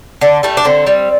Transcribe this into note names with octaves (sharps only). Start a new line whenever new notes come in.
D3 D4
G3 A3
D4
D3 C4
G3